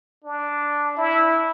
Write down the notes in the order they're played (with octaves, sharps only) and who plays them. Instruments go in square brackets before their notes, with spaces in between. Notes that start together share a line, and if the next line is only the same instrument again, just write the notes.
[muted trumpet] D4
E4